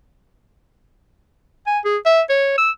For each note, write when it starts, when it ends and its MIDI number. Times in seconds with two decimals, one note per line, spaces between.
1.67 1.79 80
1.85 1.97 68
2.06 2.21 76
2.29 2.55 73
2.58 2.71 88